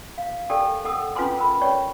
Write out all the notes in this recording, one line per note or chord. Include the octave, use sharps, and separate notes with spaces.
F5
D4 G4 A4 A#4 D5 G5
A4 F#5 D#6 E6
C#4 F4 B4 G#5 C6 D6
F4 A#4 B5
C#5 D5 G5 C#6